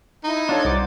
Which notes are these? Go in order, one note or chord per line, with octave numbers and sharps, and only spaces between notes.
D#4 E4
D4 F4 A4 C#5
C2 C5 D5 F#5 D6